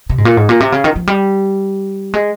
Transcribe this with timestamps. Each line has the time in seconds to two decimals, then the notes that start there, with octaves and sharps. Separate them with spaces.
0.10 C3
0.18 G#2
0.25 A#2
0.37 G#2
0.49 A#2
0.60 C3
0.72 C#3
0.84 D#3
0.96 F3
1.07 G3
2.14 G#3